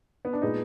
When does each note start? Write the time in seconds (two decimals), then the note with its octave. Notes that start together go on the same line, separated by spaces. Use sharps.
0.25 B3
0.33 D4
0.42 A#2 G#3 B3 D#4